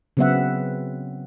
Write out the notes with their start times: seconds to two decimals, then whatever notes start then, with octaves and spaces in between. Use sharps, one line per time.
0.17 C#3 F#3 B3 C4 E5 F#5